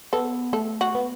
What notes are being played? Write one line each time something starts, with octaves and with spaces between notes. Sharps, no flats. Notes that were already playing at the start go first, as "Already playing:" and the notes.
B3 A4
A3 A4
F#4
B3